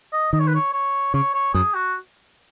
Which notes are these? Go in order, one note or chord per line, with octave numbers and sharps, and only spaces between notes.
D#5
D#3 D#5
C#5
B4
C#5
C#5
C#3 C#5
C#5
F#2 G#4
F#4